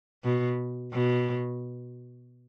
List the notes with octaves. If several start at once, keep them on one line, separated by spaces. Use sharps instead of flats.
B2
B2